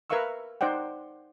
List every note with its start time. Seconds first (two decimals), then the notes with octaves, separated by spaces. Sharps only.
0.10 A#4 B4 E5 F5 C#6 E6
0.61 D#4 C5 D5 F#5 G5